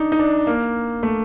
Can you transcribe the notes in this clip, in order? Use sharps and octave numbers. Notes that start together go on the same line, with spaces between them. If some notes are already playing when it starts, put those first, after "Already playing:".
Already playing: D4 D#4
D#4
D4
A#3
A3